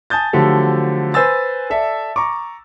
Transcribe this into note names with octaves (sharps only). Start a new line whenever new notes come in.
G#5 A5 D#6 G6 A6
D3 F3 F#3 A3 G4 A4
B4 C5 G#5 E6 A6
A4 D5 E5
A#5 C#6 D6